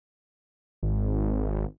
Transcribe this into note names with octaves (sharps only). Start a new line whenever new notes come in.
G#1